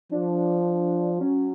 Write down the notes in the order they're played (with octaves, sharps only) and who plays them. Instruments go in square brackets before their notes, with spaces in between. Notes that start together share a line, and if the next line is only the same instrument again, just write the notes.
[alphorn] F3 [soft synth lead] D4
[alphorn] F#3 [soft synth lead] C#4